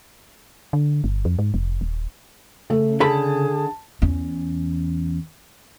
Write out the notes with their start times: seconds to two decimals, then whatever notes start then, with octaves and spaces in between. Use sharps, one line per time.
0.73 D3
1.04 G1
1.25 F2
1.39 G#2
1.54 F1
1.81 D#1
2.70 C#3 A3
3.00 D3 G#4 A4 A5 B5
4.02 E2 C#4